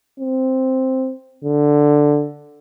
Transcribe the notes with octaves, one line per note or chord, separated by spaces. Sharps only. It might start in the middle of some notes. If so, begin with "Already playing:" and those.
C4
D3